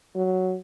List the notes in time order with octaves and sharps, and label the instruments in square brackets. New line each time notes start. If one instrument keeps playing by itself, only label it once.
[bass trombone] F#3